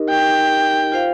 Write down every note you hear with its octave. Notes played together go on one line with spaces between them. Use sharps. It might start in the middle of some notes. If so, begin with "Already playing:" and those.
Already playing: D#4 G4 A#4 D#5
G5
F4 C5 F5